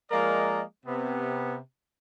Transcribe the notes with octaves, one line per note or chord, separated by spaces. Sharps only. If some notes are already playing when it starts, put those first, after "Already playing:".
F3 G#3 A#3 A#4 D5 D#5
C3 B3